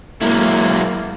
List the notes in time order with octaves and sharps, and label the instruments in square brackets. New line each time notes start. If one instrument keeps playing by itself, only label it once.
[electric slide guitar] F#3 G#3 E4 [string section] A#3